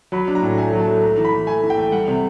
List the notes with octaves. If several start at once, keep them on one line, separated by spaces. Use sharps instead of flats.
F#3 B5
D4
A#5
A2
A3 G#5
F#3
A5
A3
A3 A#5
E3
B5
E3
A3 G#5
E3
G5
A3
G3 F#5
C3